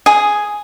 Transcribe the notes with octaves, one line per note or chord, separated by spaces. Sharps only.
G#4